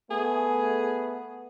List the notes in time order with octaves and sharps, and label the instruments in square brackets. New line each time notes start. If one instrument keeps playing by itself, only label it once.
[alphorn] A3 [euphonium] B3 [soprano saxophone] G#4